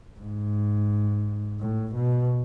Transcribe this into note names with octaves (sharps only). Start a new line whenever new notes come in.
G#2
A2
B2